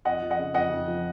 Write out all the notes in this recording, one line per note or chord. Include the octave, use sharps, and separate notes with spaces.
F2 D#5 F#5
F3
D#5 F#5
C#3
F2 D#5 F#5
F2
F3